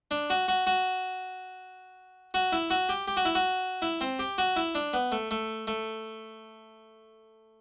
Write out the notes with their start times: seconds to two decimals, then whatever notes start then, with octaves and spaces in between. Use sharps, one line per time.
0.11 D4
0.30 F#4
0.48 F#4
0.67 F#4
2.34 F#4
2.52 E4
2.70 F#4
2.89 G4
3.08 G4
3.17 F#4
3.25 E4
3.35 F#4
3.82 E4
4.01 C4
4.19 G4
4.38 F#4
4.56 E4
4.75 D4
4.93 B3
5.12 A3
5.31 A3
5.67 A3